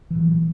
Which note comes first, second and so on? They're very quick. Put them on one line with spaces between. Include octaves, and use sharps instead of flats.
E3 A#2 F#3